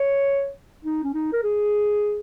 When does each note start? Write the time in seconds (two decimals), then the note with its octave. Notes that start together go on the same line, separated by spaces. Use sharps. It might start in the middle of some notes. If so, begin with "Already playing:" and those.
Already playing: C#5
0.85 D#4
1.04 C#4
1.14 D#4
1.33 A#4
1.43 G#4